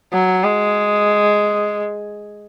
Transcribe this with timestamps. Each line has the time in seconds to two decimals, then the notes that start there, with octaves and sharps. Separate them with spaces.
0.13 F#3
0.44 G#3